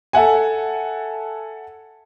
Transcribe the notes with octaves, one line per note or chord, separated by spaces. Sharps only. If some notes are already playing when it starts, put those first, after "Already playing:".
A4 E5 F#5 G#5